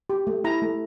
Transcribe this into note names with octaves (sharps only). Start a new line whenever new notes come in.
G4
A3
E4 A#5
A3